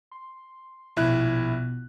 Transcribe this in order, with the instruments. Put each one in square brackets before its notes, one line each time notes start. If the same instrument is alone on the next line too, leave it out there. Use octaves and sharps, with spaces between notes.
[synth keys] C6
[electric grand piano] A#1 E4 F#6 [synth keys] B2 B3